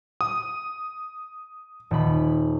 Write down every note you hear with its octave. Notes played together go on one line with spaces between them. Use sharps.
D#6
D#1 B5